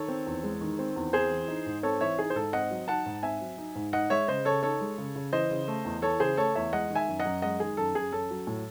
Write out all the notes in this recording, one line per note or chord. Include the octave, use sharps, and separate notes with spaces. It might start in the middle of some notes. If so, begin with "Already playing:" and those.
Already playing: D#3 A4 C#5
C4
E2
G#3
D#3
C4
E2
C4 G#4 C5
E3
D#4
G#2
C4 A4 C#5
E3 C#5 E5
D#4 G#4
C5
G#2 A4
C4 D#5 F#5
F#3
D#4 F#5 A5
G#2
C4 E5 G#5
F#3
D#4
G#2
D#4 D#5 F#5
G#3 C#5 E5
C#3 C5 D#5
C#3 A4 C#5
D#4 A4 C#5
G#3
C#3
C#3
E3 C5 D#5
C#3
A3
E2
E3 A4 C#5
C#3 G#4 C5
A3 A4 C#5
E2 C#5 E5
G#3 D#5 F#5
D#3
E5 G#5
F#2
D#5 F#5
F#2
G#3 D#5 F#5
D#3 G#4
F#2 A4
F#2 G#4
C#4 A4
F#3
A2